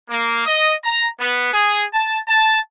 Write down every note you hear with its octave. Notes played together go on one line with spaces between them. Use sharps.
A#3
D#5
A#5
B3
G#4
A5
A5